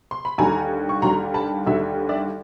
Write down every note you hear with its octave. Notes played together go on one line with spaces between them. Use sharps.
C6
B5
D#2 D3 G3 G#5 A#5
C#6
D#2 D3 G3 A#5 C6
A5 B5
D#2 D3 G3 E5 F#5
D5 E5